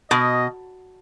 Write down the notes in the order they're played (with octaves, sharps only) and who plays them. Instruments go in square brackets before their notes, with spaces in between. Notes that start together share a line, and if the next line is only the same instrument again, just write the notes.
[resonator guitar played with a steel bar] B2 [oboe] D#5